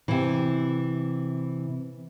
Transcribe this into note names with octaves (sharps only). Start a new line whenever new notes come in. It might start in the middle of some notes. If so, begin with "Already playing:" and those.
C3 E3